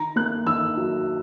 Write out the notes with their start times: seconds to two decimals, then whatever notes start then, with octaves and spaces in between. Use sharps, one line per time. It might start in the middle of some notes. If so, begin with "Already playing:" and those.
Already playing: D#3 A#5
0.16 A#3 F#6
0.46 D#3 E6
0.77 F#3